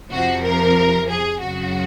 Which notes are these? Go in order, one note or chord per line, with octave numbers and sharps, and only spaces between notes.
F2 C3 F3 F#4
A#4
G#4
F#2 C#3 F#3 F#4